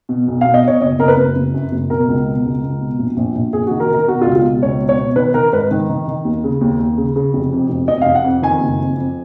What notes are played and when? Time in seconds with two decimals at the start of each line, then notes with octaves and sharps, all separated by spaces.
0.09 B2
0.28 B1
0.41 B2 F5
0.54 D#5
0.63 B2 C#5
0.81 F#1 D#5
0.99 F#1 A#4
1.08 B4
1.17 F#1
1.36 F#1
1.55 F#2
1.72 F#1
1.90 B2 A#4
2.08 C#2
2.27 B2
2.45 C#2
2.63 C#2
2.81 B2
2.99 A#1
3.17 A#1
3.35 A#1
3.53 A#1 G#4
3.67 D#3 F#4
3.80 A#4
3.90 D#3 A#4
4.07 B2 F#4
4.22 F4
4.26 C#2
4.36 F4
4.44 B2
4.62 C#2 C#5
4.81 B2
4.89 C#5
4.99 B2
5.16 D#3 B4
5.34 D#3 A#4
5.53 G#2 B4
5.71 D#3
5.89 D#3
6.08 D#3
6.25 D#2
6.44 C#3
6.61 D#2
6.79 D#2
6.98 C#3
7.16 C#3
7.34 F1
7.52 F2
7.70 F1
7.88 F1 D#5
8.01 F5
8.06 F1
8.15 F#5
8.24 F2
8.42 D#3 G#5
8.61 F#1
8.79 F2
8.97 F2